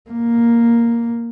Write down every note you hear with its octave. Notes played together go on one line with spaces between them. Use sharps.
A#3